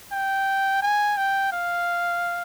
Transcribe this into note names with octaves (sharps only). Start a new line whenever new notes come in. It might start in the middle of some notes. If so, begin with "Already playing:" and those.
G5
G#5
G5
F5